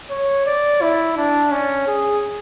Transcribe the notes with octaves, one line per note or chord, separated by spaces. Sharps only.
C#5
D5
E4
D4
C#4
G#4